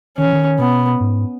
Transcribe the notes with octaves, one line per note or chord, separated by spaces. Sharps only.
D#3 C#4
E3
D#3
B2 B3
G#2